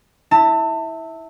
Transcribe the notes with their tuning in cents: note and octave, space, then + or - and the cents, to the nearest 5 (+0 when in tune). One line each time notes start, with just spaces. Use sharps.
E4 -15 A5 +30